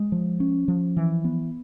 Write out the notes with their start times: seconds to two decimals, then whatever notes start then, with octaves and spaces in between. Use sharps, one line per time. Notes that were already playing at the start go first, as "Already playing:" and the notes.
Already playing: G#3
0.12 F3
0.40 C#4
0.68 F3
0.97 E3
1.24 B3